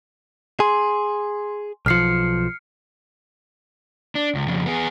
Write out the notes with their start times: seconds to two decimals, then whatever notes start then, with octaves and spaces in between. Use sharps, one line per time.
0.60 G#4 C6
1.86 B1 F3 F6 C7 C#7
4.15 D4
4.35 C#2
4.48 F2 C#3
4.66 B3 G#4